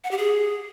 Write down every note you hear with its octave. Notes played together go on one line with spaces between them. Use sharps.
F#5
G4
G#4